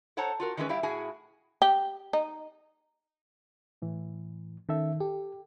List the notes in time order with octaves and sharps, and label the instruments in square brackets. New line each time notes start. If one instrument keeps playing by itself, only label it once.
[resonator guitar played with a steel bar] A4 C5 C#5 F#5 A5 A#5
F4 F#4 A#4
D#3 E3 G#3 C4 C#4 B4
G3 E4 G4 E5 F5
A2 E4 F#4 G#4 G#5
[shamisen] G4
D#4
[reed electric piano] A2 E3
[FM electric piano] D#3 [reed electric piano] C#4 A4 E5
[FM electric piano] G4 [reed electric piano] A4